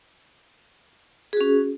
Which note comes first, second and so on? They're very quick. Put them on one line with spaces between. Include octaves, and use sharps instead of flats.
G#4 F#4 C#4